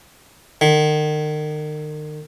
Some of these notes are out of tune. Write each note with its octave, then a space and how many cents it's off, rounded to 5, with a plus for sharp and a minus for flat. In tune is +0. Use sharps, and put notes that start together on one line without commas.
D#3 -40